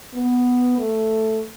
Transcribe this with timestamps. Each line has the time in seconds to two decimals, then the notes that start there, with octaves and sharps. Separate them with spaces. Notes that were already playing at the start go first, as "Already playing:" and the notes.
0.14 B3
0.78 A3